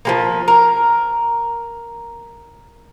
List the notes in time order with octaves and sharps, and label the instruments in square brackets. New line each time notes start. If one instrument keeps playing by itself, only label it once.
[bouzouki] F3 G#3 A#3
A#4